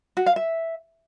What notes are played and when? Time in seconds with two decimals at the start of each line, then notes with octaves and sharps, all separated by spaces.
0.17 F#4
0.26 F5
0.36 E5